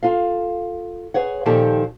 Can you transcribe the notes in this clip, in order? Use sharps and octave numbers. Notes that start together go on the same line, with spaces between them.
F4 A4 F5
G#4 B4 C#5 F#5
A#2 D#3 F3 D#4 G4 A4